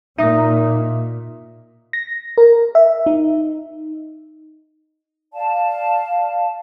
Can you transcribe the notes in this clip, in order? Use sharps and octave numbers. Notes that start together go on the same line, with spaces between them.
A#2 D#4 E5 D#6
A#6
A#4
E5
D#4
D5 F5 A5